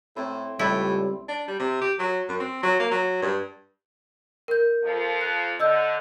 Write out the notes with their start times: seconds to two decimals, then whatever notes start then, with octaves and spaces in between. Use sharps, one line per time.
0.16 A2 C4 C5 E5
0.59 C#2 A2 G3 E4
1.28 D4
1.48 G3
1.59 C3
1.81 G4
1.99 F#3
2.29 F#2
2.40 C4
2.63 F#3
2.79 A#3
2.91 F#3
3.22 G2
4.48 A#4 G6
4.83 F2 F3
5.21 F#6
5.60 D3 D#5 E6 G6